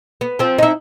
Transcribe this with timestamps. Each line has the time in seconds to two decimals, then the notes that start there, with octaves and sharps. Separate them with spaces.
0.21 B3
0.39 F3 C4
0.58 D#4 E4